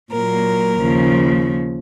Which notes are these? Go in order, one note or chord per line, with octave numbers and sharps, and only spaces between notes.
A#2 F#3 A#3 A#4
D#2 C#3 F3